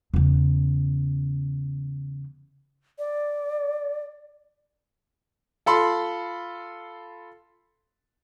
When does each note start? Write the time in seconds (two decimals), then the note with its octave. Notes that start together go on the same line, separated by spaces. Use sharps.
0.14 E2 C#3
2.99 D5
5.66 F4 A4 B5 C6